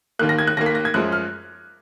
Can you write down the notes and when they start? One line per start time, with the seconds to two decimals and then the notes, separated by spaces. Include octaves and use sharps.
0.19 D#2 D#3 A#3 F#6
0.29 A#6
0.39 G#6
0.47 F#6
0.57 D#2 D#3 A#3 A#6
0.66 B6
0.75 A#6
0.85 G#6
0.94 F#2 F3 G#3 F#6
1.12 F6